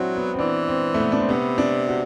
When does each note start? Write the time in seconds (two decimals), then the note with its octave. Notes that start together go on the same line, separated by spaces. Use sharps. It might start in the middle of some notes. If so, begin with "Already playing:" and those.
Already playing: F#3 C4 D4 E4 F#4
0.16 B3
0.34 C4
0.39 E3 D4
0.68 C4
0.94 A3
0.99 B3
1.12 D4
1.20 C4
1.28 C3 B3
1.58 D4
1.89 F#4